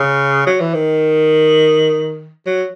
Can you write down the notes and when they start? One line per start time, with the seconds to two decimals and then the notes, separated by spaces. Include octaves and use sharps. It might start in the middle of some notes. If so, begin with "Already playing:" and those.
Already playing: C#3
0.47 F#3
0.60 E3
0.74 D#3
2.46 F#3